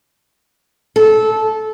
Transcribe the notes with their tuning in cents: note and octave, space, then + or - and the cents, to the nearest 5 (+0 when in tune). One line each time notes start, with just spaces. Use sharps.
A4 -15